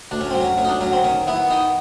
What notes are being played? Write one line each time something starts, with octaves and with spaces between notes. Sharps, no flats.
D2 D4
C#4
F#3 C4
C#4
D2 C#4
D#4
D4
F#3 C#4
C4
D#3 C#4
B3 E4
D#3 D#4